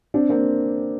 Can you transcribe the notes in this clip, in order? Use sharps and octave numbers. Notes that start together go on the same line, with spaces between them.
C4 D4
A#3 C4